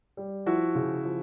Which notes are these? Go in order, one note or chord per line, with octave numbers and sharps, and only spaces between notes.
G3
F3 E4 F#4
C#3
F3